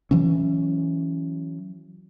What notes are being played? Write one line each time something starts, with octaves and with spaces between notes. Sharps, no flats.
E3 F#3 C#4